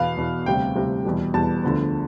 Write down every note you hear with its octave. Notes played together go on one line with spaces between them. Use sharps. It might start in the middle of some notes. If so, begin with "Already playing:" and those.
Already playing: E2 B2 B3 F5
E2 B2 B3
D2 C3 G3 G5
D2 C3 G3
E2 B2 G3
E2 B2 G3 A5
D2 D3 F3 B3